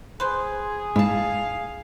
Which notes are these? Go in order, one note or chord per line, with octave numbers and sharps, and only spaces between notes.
G#4 B4 C5
G#2 E4 F5 A5